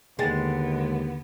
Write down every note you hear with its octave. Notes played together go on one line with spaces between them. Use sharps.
D#2 D3 G#3 B3 G#4 G5 A6